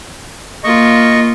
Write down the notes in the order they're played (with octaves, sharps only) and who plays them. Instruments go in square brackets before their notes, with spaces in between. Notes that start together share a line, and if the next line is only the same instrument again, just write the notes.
[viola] A#3 F4 [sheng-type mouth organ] D#5 C#6